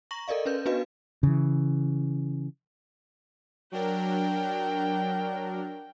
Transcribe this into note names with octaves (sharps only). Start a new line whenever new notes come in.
A#5 C#6 A#6 F#7
A4 A#4 D5 D#5 F5
C#4 B4 G6
B3 D4 F#4 B4 D#5 F5
C#3 E3
F#3 D4 A#4 G5